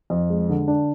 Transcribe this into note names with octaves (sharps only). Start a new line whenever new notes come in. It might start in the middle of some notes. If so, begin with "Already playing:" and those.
F2
G#3
D3
D4